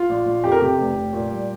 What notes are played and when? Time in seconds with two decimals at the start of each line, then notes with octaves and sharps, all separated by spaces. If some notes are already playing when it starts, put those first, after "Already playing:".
Already playing: F4
0.09 A#1
0.26 A#1
0.44 F2 G4
0.52 A#4
0.59 C3 G4
0.78 F1
0.96 F1
1.13 A#2
1.30 G3